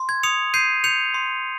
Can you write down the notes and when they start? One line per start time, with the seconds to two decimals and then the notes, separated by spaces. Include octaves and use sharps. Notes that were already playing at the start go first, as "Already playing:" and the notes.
Already playing: C6
0.09 G#6
0.23 D#6 C#7 F7
0.54 G6 C7 D#7
0.84 G6 C#7 F7
1.14 C6